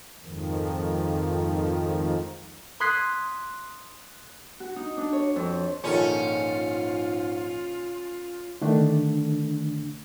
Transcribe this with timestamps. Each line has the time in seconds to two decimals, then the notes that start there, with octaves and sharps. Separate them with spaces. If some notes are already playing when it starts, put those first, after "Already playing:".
0.21 F2 G#2 D#3 F3
2.80 C6 D#6 F#6 G#6 B6 C7
4.60 F#4
4.76 D#4
4.97 D4
5.13 C#5
5.36 F2
5.84 A#1 G#2 D#3 C#4 F4 A4
8.61 D3 D#3 A3 D4